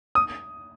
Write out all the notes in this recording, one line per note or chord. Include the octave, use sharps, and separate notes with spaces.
D#6